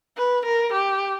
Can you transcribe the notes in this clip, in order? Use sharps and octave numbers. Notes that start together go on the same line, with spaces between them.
B4
A#4
G4